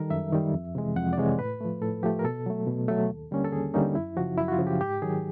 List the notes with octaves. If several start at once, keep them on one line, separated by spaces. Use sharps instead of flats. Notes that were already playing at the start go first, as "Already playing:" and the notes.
Already playing: D#3 G3 A4 A#4
F#2 E5
D#3 G3
F2
C3 E3 G#3
F2 F#5
D5
C3 E3 G#3 C#5
A2 B4
F3 A3
A2 A4
F3 A3 G4
A#4
B2 A4
F#3 A3
B2
F#3 A3
D#2
D3 G3 A#3 C#4
A4
D#2 G#4
D3 G3 A#3 C#4 D#4
F#2 E4
C#3 F3 F#4
F#2 E4
F#4
F4
C#3 F3
G4
G#2 G4
D#3 F#3 G#4